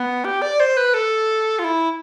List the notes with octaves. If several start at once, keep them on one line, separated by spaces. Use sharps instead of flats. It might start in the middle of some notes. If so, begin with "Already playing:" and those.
Already playing: B3
G4
D5
C5
B4
A4
F4
E4